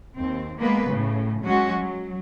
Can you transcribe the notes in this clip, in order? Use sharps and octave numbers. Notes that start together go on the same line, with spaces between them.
D#2 C4
G#3 A#3 B3 B4
A2 C#3
F#3 G#3 C#4 F#4
F#3